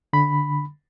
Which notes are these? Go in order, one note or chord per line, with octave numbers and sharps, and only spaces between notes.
D3 B5